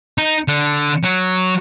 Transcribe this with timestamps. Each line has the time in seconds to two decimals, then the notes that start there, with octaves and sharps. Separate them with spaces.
0.18 D#4
0.48 D3
1.04 F#3